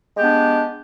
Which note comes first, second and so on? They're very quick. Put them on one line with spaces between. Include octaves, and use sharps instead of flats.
G#3 G4 B3 D4